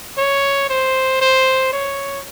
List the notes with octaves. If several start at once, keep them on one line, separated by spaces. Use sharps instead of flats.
C#5
C5
C5
C#5